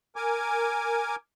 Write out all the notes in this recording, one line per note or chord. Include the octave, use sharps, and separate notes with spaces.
A#4 G#5 D6